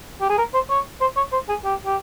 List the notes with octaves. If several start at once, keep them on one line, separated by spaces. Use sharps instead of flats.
G4
G#4
A#4
C5
C#5
C5
C#5
C5
G#4
G4
G4